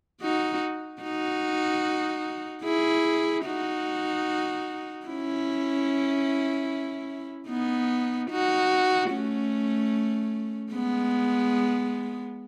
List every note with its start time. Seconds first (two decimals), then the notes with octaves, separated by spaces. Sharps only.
0.22 D#4 F#4
1.02 D#4 F#4
2.64 E4 G#4
3.46 D#4 F#4
5.07 C#4 E4
7.49 B3 D#4
8.30 D#4 F#4
9.11 A3 C#4
10.72 G#3 B3